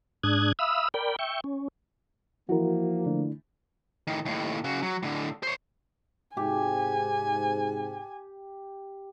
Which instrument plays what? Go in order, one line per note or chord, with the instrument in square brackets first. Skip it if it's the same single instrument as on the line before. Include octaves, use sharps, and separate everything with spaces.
[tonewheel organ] G#2 D4 D#6 F#6 G#6
E5 F5 B5 D#6 E6
A#4 D5 G5 B5
E5 G5 C#6
C#4
[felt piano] E3 [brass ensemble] F3 A#3 [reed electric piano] F#4 A#4
[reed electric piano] D3 A3 D4
[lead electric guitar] A2 D#3
D#2 A2
C#3 F#4
F#3
A2 D3
C5 C#5
[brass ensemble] G#2 C3 [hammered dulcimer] G4 [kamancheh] G#5